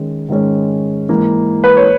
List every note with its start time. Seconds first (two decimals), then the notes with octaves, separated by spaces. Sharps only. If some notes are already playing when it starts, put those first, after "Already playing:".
Already playing: D#3 G#3 C#4
0.29 G#2 D#3 G#3 C#4
1.09 G#2 E3 A#3
1.64 B4
1.77 C#5